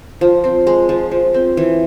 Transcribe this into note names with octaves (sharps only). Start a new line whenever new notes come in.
F3
C4
G#3
F3
F3
C4
E3